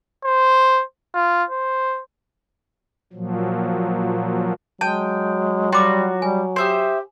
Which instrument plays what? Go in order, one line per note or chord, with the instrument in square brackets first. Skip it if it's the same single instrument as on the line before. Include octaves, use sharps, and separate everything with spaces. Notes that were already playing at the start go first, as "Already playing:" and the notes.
[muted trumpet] C5
F4
C5
[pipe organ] A#2 F3 F#3
[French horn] F#3 [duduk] G#3 [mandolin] G5 [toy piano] A5
[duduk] G3 [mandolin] F4 F#4 [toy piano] G5 D6
[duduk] G3 [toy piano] G#5
[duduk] G4 [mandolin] C5 E5 D#6